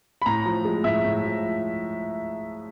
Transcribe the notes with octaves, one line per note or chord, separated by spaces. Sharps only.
B5
A2 A#5
F3
G#3
A2 E5
A2
F3